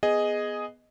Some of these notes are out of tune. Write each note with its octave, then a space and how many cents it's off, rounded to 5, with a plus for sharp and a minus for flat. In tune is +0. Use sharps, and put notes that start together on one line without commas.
B3 +0 G#4 +0 D#5 +0